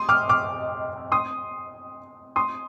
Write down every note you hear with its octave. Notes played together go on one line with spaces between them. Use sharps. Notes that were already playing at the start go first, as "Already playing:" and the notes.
Already playing: C6 D#6
D6 F6
D6 F6
C6 D#6
C6 D#6